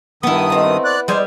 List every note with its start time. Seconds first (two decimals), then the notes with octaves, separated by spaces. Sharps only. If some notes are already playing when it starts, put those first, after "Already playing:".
0.23 G2 D#3 B3 E4 D#6
0.50 A3 C4 D#4
0.85 D5 F#6
1.08 G3 G#3 C5 D5 G#5